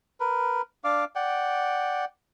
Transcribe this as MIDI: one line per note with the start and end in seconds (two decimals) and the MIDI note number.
0.20 0.62 70
0.20 0.62 71
0.84 1.04 62
0.84 1.04 74
0.84 1.04 77
0.84 1.04 86
1.15 2.05 74
1.15 2.05 78
1.15 2.05 79